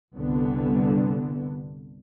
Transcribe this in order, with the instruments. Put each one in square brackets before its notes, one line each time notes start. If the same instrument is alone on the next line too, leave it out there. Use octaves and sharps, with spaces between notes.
[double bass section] G1 C2 D3 B3